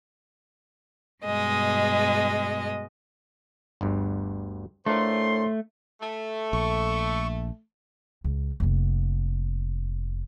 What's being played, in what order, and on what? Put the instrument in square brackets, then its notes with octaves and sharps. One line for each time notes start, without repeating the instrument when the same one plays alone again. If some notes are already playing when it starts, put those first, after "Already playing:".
[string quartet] G2 B2 G#3 D#5
[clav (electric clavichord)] G1 D2 G2
[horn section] A2 C5 C6 [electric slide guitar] A3 [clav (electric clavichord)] D4 F4 A#4
[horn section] A3
[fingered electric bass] A#1 [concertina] C#6
[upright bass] C#2
F1 A#3